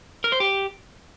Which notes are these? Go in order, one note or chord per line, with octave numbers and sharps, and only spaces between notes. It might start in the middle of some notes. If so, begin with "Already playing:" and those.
A#4
C5
G4